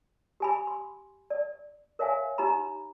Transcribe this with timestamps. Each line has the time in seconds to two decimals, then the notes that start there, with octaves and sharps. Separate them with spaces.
0.40 G4 G#5 B5
0.67 C6
1.30 D5
1.99 A#4 C#5 E5 F5 G#5
2.38 D#4 G4 A#5 B5